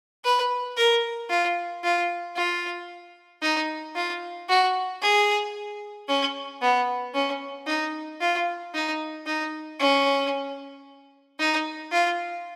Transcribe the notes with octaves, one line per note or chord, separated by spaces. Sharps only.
B4
A#4
F4
F4
F4
D#4
F4
F#4
G#4
C#4
B3
C#4
D#4
F4
D#4
D#4
C#4
D#4
F4